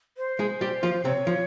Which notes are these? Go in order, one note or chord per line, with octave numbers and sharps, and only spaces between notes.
C5
G#3 G#4
G3 G4
F3 F4
C3 C4 C#5
F3